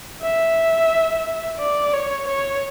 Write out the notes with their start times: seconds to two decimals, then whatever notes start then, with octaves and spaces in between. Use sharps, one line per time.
0.22 E5
1.59 D5
1.93 C#5
2.28 C#5